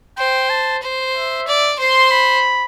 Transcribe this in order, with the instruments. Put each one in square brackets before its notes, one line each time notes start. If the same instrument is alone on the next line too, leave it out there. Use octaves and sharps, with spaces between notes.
[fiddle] C5 [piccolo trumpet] G5
[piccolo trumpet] A5
[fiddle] C5
[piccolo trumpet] E5
[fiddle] D5
[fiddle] C5 [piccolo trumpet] C6
[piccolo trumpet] B5